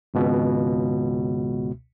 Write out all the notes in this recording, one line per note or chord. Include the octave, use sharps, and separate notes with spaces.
G#1 C#2 B2